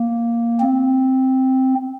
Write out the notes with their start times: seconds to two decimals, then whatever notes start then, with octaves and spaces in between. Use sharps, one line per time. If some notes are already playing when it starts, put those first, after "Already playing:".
Already playing: A#3
0.60 C4